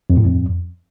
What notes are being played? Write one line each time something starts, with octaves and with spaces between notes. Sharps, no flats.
F2
A2
F2